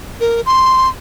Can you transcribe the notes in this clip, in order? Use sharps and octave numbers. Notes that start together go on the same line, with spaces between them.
A#4
C6